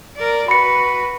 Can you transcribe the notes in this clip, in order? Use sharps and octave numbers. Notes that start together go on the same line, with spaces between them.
A#4 D5
F#4 B4 B5 C#7